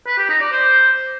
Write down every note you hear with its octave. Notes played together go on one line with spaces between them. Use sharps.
B4
G4
D#4
D5
C5